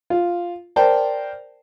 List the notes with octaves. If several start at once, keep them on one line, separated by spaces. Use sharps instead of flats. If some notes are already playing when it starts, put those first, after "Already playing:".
F4
A#4 C5 D5 G5 A5